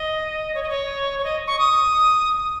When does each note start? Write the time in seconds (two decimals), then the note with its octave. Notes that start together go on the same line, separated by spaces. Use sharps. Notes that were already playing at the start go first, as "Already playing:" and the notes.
Already playing: D#5
0.54 C#5
0.63 D#5
0.69 C#5
1.19 C#5
1.24 D#5
1.47 C#6
1.59 D#6